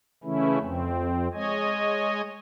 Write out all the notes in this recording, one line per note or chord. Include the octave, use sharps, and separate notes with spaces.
C#3 E3 A3 C#4 E4
F2 C4
G#3 C#5 D#5 G#5